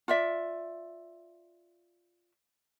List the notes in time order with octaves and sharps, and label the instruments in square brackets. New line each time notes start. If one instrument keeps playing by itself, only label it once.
[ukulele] F4 D5 E5